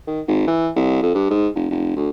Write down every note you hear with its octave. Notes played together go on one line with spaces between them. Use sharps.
D#3
G#1
E3
C2
F2
G2
G#2
F1
F1
D2